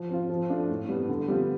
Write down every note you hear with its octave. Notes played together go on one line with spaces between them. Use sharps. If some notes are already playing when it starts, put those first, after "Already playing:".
Already playing: F3
C4 F4
F3
A3 D4 F4
A2
G3 B3
D3
G3 B3 F4